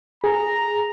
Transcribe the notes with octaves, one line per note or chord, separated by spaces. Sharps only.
G#4 A#5